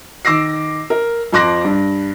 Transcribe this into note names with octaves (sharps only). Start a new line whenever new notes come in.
D#3 D6 E6 A#6 C7
A#4
F2 F3 C6 D6 F#6 A#6
G2